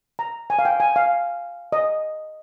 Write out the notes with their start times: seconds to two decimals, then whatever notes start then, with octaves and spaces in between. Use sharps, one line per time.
0.19 A#5
0.50 G#5
0.59 F5
0.65 G5
0.80 G#5
0.96 F5
1.72 D#5